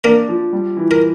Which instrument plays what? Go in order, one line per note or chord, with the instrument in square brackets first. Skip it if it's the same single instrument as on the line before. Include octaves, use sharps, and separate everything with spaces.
[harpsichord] A#3 A#4 [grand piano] D4
[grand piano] F3
G3
E3
[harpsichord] A#4